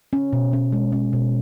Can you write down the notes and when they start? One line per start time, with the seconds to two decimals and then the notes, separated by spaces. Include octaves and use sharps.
0.13 C#4
0.33 B2
0.53 C#4
0.73 G#3
0.92 C#4
1.13 B2